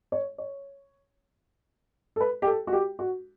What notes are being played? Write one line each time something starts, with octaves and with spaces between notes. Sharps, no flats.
C#5
C#5
A4
B4
G4
A4
F#4
G4
F#4